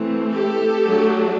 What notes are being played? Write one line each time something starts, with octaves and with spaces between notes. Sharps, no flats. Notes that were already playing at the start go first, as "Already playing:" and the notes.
Already playing: E3 A3 C4
G4 A4
F#3 A3 D4